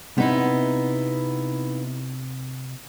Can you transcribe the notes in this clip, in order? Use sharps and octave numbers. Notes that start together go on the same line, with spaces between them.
C3 B3 D#4 E4